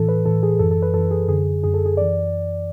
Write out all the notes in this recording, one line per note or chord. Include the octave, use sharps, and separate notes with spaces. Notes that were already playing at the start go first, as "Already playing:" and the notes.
Already playing: A2 E3 A4
B4
A2 E3 A4
G#4
F#2 E3 A4
A4
B4
F#2 E3 A4
G#4
F#2 D3 G#4
F#2 D3 G#4
A4
G#4
F#2 E3 D5